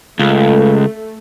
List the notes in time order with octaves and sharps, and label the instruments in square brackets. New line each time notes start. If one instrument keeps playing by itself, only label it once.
[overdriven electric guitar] C#2 [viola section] A3